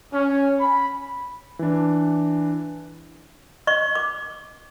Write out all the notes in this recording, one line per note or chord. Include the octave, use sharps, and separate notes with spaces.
C#4
B5
E3 D4
D#5 C#6
D6